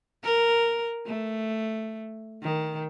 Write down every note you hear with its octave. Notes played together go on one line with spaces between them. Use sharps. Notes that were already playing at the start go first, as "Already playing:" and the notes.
A#4
A3
D#3